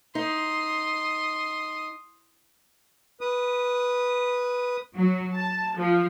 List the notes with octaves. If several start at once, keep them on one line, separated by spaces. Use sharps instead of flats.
D#4 C6 D#6
B4 D#6
F#3
A5
F3